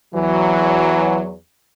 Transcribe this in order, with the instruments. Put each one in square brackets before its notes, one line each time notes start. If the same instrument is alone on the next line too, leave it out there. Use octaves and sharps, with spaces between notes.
[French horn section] E2 F#3 [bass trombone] E3